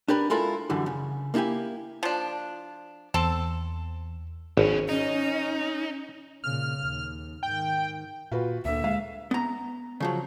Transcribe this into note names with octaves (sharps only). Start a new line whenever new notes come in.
D4 G4 A#4 B4
G#3 E4 F4 A4 A#4
F#2 D3 E3 G3
C#3
A#3 D4 E4 G4 G#5
F3 D4
E2 C4 A4
G#1 B2 C#4
C#4 D#4
A#2 C#3 F6
D#2
G#2 D#3 G5
A#2 F4 F#4 B4
D2 D3 A#3 E5
G#3 F5
B3 A#5
C#3 F3 F#3